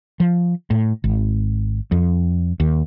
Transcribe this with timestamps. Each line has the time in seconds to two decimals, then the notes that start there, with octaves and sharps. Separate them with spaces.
0.20 F3
0.70 A2
1.04 G#1
1.92 F2
2.60 D#2